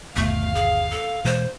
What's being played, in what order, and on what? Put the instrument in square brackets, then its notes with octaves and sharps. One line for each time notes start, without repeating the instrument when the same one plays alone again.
[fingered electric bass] G1 D#2 B2 [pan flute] A3 [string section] F5
[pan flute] G#4
A4
[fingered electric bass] B2 E3 G#3 [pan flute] C5